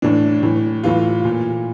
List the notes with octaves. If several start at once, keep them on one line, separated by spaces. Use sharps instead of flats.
A2 E3 D4
A2 E3
A2 E3 F4
A#2